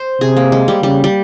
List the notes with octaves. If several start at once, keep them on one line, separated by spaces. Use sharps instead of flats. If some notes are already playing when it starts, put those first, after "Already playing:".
Already playing: C5
C3 G#4
A#3
G#3
G3
C#3 G3
G3